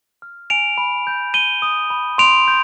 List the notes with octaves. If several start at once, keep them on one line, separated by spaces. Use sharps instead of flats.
F6
G#5 D7 F7
B5
G6
B5 D#7 G7
D#6
B5
C6 D7 F7
G6